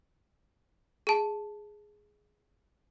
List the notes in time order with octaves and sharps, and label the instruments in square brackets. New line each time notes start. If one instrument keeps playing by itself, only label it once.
[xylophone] G#4 A5